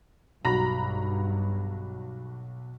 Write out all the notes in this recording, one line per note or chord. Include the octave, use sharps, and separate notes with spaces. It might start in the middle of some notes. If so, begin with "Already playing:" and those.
B1 G2 F#4 A#5 B5 A#6